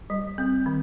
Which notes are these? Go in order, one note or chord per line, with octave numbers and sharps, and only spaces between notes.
G3
C4
D#3